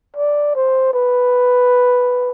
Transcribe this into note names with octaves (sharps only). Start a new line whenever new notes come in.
D5
C5
B4